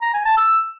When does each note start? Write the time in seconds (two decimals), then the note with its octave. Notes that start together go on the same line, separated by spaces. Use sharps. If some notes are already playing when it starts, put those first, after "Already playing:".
0.02 A#5
0.14 G#5
0.25 A5
0.37 E6